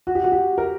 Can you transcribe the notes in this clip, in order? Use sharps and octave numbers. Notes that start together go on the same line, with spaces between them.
F#4
G4
F#4
G4
A#4